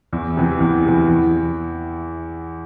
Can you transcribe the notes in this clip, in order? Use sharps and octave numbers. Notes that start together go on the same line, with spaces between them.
E2
C3 E3
E2
C3 E3
E2